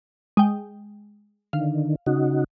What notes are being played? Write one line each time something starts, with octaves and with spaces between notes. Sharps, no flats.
G#3 G5
D3 D#3 F5
C#3 D#4 F#4